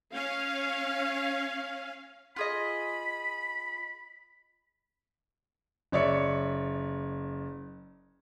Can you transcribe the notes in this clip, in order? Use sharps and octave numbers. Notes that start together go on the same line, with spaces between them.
C#4 F5
F4 G#4 D#5 B5
F#1 C#5 D5 E5 C#7